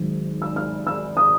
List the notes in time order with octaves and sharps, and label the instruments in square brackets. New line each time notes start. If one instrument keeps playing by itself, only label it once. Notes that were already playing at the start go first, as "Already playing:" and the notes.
Already playing: [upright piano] G#1 G#2 D#3 F#3
E6
F6
E6
D#6